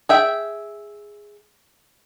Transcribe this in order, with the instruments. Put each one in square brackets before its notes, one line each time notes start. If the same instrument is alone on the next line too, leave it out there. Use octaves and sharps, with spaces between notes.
[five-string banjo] G#4 E5 G5